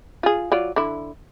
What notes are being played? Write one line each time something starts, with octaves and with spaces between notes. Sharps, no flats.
F4 G#4
F#3 F4 D5
D3 E4